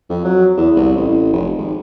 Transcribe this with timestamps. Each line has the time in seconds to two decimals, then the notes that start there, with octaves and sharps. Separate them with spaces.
0.10 F2
0.24 F#3
0.57 E2
0.76 C2
0.96 A1
1.33 F1
1.58 G#1